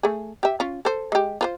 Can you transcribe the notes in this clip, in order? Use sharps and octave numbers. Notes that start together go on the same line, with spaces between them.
A3 G#4
G4 E5
C#4 F4
A4 C5
G#3 G4
F4 B4 C5